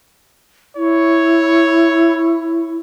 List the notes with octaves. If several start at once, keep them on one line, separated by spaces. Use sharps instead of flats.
E4 C#5